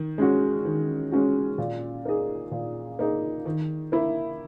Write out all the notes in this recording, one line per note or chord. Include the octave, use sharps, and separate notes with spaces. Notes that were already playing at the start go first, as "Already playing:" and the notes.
Already playing: D#3
G#3 C#4 F#4
D#3
G#3 C#4 F#4
A#2
A#3 D#4 G#4
A#2
A#3 D#4 G#4
D#3
A#3 E4